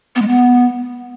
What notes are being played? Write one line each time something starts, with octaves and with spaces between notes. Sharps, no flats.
B3
G#3
B3